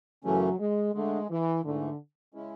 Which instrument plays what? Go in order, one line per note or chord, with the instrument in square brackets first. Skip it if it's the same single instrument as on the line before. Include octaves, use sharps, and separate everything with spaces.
[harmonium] F#2 C#3 E3 A3 C#4 [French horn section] F#3
[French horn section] G#3
[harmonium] D3 A3 D4 [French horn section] G#3
[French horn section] E3
[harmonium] G#2 E3 A3 [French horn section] D3
[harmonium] C#3 G#3 C#4 E4